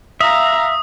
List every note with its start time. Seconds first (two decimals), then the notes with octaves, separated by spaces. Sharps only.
0.21 E5 F5 A#5 D#6